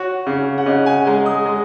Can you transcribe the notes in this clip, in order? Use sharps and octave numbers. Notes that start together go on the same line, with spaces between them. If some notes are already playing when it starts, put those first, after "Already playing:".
Already playing: F#4 C#5
C#3
F#5
C#3 D#5
G#5
G#3 A#5
D#6
G#3